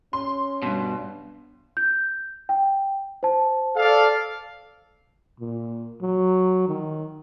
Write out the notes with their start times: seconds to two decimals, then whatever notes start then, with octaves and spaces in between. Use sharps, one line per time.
0.13 C#4 C6
0.62 G2 B2
1.77 G6
2.49 G5
3.23 C5 A5
3.77 A4 D5 F5
5.40 A#2
6.01 F#3
6.68 D#3